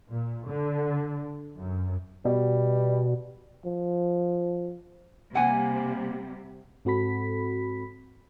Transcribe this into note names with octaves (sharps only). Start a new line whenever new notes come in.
A#2
D3
F#2
B2 G3
F3
C3 G3 A#3 F#5 G#5
G#2 C4 F#4 A4 B5 B6